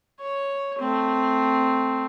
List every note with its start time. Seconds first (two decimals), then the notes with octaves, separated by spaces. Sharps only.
0.20 C#5
0.79 A3 C4